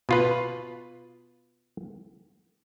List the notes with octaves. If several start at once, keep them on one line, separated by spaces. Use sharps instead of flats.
B2 F4 B4